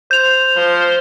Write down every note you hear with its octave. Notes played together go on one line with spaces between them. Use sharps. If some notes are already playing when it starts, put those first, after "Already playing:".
C5 G6 F7
F3 C5